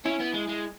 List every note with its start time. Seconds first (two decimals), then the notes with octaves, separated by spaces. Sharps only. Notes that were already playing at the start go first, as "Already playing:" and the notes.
0.05 C#4 E4
0.20 B3
0.34 G#3
0.49 G#3